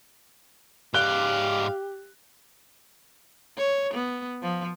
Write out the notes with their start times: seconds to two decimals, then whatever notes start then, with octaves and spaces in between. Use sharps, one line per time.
0.94 G#2 G4 D5 F5 F#6 G7
3.57 C#5
3.93 B3
4.43 F3